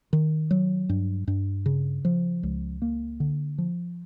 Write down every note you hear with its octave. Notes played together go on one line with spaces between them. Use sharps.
D#3
F#3
G2
G2
C#3
F3
C#2
A#3
D3
F3